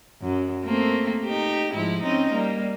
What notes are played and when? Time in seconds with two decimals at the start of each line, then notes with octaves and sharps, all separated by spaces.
0.21 F#2
0.64 A3 A#3 C4
1.25 D#4 G4
1.74 G#2 F3 E4
2.03 C4 C#4 D#4
2.34 G3 A#3